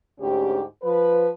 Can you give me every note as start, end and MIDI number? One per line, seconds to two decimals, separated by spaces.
0.20 0.62 38
0.20 0.62 44
0.20 0.62 61
0.20 0.62 67
0.83 1.28 53
0.83 1.28 71